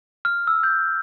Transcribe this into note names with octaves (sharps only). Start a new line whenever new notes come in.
F6
E6
G6